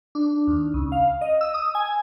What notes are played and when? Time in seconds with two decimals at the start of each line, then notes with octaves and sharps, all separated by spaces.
0.15 D4
0.47 D#2
0.74 C#2
0.92 F5
1.21 D#5
1.41 E6
1.54 D#6
1.75 G#5